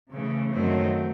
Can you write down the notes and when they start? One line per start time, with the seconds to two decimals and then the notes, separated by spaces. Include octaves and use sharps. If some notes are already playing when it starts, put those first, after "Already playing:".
0.12 C#3 E3 A3
0.51 F#2 D#3 F#3 A3 C4